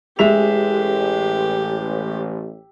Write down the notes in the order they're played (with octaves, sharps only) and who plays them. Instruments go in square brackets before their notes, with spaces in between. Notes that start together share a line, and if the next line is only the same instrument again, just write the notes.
[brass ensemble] A1 [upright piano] G#3 E5 F7 [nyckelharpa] G4